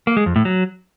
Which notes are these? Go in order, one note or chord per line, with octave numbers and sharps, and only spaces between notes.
A#3
G#3
F2
A2
F#3